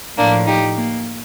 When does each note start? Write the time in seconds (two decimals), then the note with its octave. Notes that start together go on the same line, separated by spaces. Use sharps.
0.18 A2 F3 A#3 D4
0.47 D#4 G4
0.77 A#3